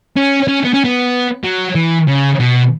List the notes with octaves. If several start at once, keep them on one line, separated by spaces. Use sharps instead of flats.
C#4
C#4
B3
C#4
B3
F#3
E3
C#3
B2